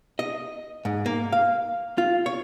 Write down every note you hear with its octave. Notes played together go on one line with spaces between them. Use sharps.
D#5
G#2
A#3
F5
F4
C#5